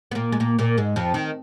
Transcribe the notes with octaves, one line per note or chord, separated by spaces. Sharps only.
B3
A#2 A#3
G#3
A#2 A#3
A#2 A#3
G#2 G#3
F2 F3
D#3